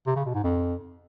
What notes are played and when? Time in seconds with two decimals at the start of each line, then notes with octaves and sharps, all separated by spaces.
0.06 C3
0.16 C#3
0.25 B2
0.34 G#2
0.44 F2